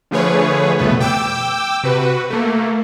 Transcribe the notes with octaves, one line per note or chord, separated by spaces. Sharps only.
D3 F3 A3 G#4 B4 C#5
C2 F2 B2 A3 B3 B4
G5 D6 E6
C3 F#4 B4
F#4 B4
A3 A#3